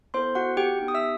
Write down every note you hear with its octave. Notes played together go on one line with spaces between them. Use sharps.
B3 E4 A4 C5 C6
F#4 F#5
G4 G5
B3 D#4 G4
D#6
E5 E6